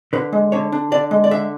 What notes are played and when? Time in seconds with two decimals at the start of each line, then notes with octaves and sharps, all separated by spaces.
0.13 D3 B4
0.33 G#3
0.52 D3 C#5
0.72 D4
0.92 D3 D5
1.11 G#3
1.24 D5
1.31 D3 E5